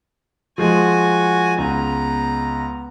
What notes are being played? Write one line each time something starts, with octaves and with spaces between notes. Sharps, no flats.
F3 G#3 F#4 G#5
C#2 B3 A#5